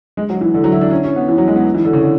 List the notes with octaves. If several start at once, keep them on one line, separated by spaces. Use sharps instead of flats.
G#3
F#3
E3
D3
F#3
E4
D4
C#4
C#4
B3
E3
F#3
G#3
B3
E3
D3
C#3
D3